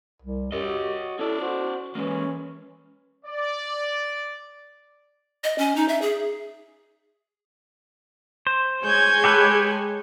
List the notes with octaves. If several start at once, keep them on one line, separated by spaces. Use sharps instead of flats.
C2
F#2 G4 C#5 D#5
F#4
C#4 E4 A4 D5
F#4 C5
E3 G#3 A#3 C#4
D5
D#5
C#4
D#4
E5
G#4
C5
G#3 C#5 G#5 G6 G#6
G4 A4 B4